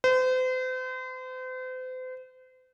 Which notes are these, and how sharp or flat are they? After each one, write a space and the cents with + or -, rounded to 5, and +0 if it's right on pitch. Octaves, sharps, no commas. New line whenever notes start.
C5 -40